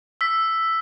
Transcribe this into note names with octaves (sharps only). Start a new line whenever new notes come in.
E6 B6